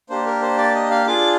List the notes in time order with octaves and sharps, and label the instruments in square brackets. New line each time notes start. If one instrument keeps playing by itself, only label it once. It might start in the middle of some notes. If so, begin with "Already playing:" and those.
[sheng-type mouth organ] A#3 D4 G4 C5
A#4
C5
D5
D#5
F5
D4 F4 G#4 D6